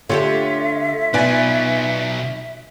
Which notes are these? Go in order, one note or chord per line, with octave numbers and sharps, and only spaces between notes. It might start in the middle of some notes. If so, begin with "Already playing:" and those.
D3 A3 F4 G4 A4 C#5 E5
B2 D#4 F4 B4 D5 G#5